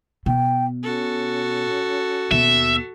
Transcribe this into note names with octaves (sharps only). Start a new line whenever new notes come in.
B2 G5
C#4 F#4 A4
D#2 B2 E5